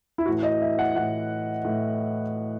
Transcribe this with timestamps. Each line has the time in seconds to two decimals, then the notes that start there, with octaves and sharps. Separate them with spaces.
0.18 E4
0.26 A2 E3 F#4
0.43 D#5
0.61 E5
0.79 F#5
0.95 A2 E3 F#5
1.65 A2 E3